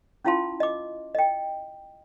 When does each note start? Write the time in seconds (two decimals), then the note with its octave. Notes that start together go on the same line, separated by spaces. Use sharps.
0.25 C#4 E4 F4 F5 A5 C6
0.60 D#5 D6
1.15 D#5 G5